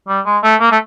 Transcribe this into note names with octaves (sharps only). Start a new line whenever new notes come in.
G3
G#3
A3
A#3
A3